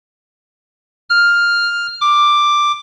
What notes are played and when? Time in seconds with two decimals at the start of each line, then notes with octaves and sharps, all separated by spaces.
1.10 F6
2.01 D6